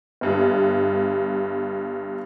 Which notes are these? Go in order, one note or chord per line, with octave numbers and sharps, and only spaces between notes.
G1 G2